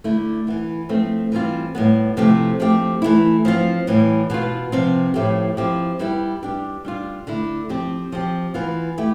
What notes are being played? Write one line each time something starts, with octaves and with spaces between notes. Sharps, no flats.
D3 A3 E4
E3 B3 E4
F3 A3 C4
E3 G3 C4 F4
A2 G3 B3
C3 F3 A3 E4 G4
F3 A3 C4 G4
E3 A3 E4
F3 C4 F4
A2 E3 G3
B2 B3 F4
C3 F3 C4
A2 F3 A3 E4 G4
F3 C4 E4 G4
G3 B3 E4 G4
G3 D4 G4
G3 D4 F4
D3 A3 E4
F3 C4 G4
F3 C4 G4
E3 B3 F4
A3 E4 G4